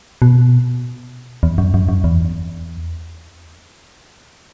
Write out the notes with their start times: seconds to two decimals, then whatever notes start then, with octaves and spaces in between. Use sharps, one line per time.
0.22 B2
1.43 E2
1.58 F#2
1.74 F#2
1.89 F#2
2.04 E2